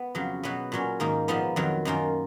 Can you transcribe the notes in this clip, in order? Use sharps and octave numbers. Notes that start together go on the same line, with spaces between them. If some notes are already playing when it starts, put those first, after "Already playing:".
Already playing: B3
F2 C#3 F#3
B2 F#3 B3
A#2 F#3 C#4
G#2 D#3 A#3 D#4
A#2 F3 B3 D#4
F2 D#3 F#3
F#2 D#3 A#3 F4